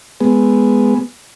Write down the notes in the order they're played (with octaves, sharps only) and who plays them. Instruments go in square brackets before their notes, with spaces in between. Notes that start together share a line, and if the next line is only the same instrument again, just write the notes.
[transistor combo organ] G#3 B3